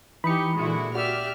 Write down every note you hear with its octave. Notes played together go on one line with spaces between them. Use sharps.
E3 D#4 G4 B5 C#7
A#2 D3 G#3 E4 F#4
F#4 G4 D5 E5 F6